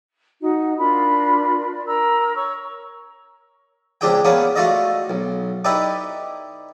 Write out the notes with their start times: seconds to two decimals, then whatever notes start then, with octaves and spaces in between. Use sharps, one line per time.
0.41 D#4 F#4
0.78 D4 F4 A#4 B5
1.73 D5
1.86 A#4 A#5 E6
2.35 C#5 C#6 E6
4.01 C#2 C4 D4 G4 G#4 G5
4.24 A#3 B3 C#4 D4 G#4 F#5
4.56 A3 F4 F#4 A4 D5 D#5
5.10 B1
5.64 D#4 E4 G4 A4 B4 D5